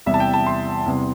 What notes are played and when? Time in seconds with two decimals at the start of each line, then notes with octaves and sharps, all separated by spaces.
0.06 E2 C3 G3 E5
0.14 A5
0.20 G5
0.34 A5
0.46 C6
0.86 E2 C3 G3